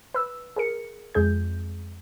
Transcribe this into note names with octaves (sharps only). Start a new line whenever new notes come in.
B4 E6
G#4 A#4 C#7
F2 G#3 G#4 G6